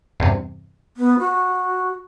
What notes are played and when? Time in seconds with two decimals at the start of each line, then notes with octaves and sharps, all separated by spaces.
0.20 E2 G2 C3
0.97 B3
1.19 F#4